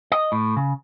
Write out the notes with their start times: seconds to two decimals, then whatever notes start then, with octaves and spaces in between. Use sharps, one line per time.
0.12 D#5
0.32 A2
0.57 C#3